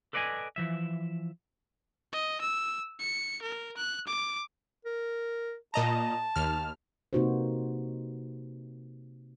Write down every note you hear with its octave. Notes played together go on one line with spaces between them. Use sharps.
A4 B4 D5 D#5 F#5 G#5
E3 F3 E5
D#5
E6
C#7
A#4
F#6
D6
A#4
A#2 D#5 A5 A#5
D#2 F6
C3 A#3 D#4 F#4 B4 C5